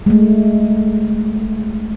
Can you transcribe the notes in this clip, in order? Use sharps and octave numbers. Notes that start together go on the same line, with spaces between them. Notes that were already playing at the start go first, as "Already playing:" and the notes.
G#3 A3